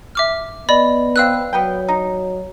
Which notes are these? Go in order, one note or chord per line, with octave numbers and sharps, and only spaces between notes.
E5 D6 F6
B3 D5 D#5 B5
C4 B4 F5 E6 F#6
F#3 B3 B4 G5
D#4